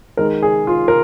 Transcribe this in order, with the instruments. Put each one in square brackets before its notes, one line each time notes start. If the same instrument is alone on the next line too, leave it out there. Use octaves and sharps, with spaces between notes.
[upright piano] D#3 G#3 A#4
G#4
F4
A#4